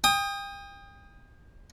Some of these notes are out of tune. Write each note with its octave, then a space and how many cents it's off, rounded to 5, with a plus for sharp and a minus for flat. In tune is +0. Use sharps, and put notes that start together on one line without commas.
G5 +35 D#6 +0